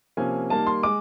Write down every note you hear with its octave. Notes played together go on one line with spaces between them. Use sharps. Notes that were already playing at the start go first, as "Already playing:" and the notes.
C3 F3 A#3 C#4 G#5
D#3 G3 A#3 A5
C6
G#3 D6